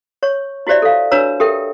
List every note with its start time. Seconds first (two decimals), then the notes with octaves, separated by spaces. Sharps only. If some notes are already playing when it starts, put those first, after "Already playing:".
0.23 C#5 C#6
0.67 E4 F#4 G4 C5 D5 E5
0.82 A4 F5
1.11 D4 F#4 B4 C#5 A#5 E6
1.40 G4 A4 A#4 E5 G5